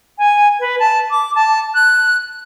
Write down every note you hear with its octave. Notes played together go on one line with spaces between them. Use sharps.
G#5
B4
A5
D6
A5
F#6